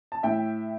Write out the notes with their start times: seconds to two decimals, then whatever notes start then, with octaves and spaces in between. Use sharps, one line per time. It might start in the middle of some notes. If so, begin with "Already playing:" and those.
0.12 A5
0.23 A2 E5 G5